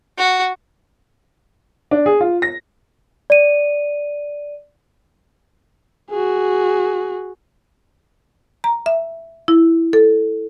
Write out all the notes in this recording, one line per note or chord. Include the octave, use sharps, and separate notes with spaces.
F#4
D4
G#4
F4
A#6
D5 D#7
F#4 G#4
A#5
E5
E4
A4